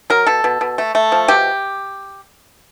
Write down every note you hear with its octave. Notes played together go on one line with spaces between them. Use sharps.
F#3 A#4
B2 A4
B2
B2
A3
A3
F3
B2 G4